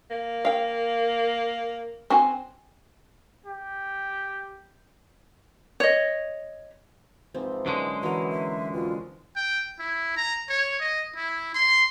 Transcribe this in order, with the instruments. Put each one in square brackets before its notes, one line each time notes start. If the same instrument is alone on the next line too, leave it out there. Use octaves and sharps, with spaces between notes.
[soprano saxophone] A#3
[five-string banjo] F5 G5
C4 F#4 G#5
[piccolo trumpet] G4
[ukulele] C#5 D#5
[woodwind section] G#2 E3 F3 [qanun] C4
[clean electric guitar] F#2 D3 G#3 [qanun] B3 F#5
[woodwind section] B2 F#3 E4 [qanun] E3 A#4 [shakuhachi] F#5
[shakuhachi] E5
[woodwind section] F2 B2 [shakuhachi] F4
[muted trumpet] G5
E4
A#5
C#5
D#5
E4
C6